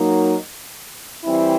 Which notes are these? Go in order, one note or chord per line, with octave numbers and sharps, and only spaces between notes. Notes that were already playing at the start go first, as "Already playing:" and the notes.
Already playing: F#3 A#3 D#4
E3 G3 C4 E4